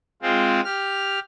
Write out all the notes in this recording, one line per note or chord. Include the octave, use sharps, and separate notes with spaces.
G#3 C4 F4
G4 F6